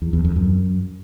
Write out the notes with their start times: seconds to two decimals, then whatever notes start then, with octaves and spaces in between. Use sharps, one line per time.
0.02 E2
0.13 E2
0.25 F2
0.36 F#2